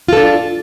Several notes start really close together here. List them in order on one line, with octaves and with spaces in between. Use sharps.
F4 A4 D4